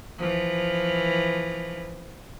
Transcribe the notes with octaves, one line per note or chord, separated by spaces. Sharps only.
E3 F3